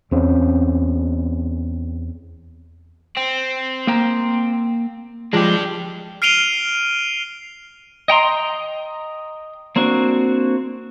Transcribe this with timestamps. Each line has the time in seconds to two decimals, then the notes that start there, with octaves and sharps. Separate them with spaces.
0.11 E2 C4 C#4
3.17 C4
3.87 A#3 G5 A#5
5.33 F3 G#3 D4 G4
6.22 F6 C7 D7 D#7 F7 G7
8.08 D#5 G5 A#5 C6
9.76 A#3 C4 D4 F#4